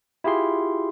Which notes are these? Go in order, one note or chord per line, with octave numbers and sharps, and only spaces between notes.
E4 F4 G4 G#4 C6